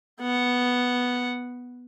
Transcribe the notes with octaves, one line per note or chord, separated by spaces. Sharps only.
B3 F#5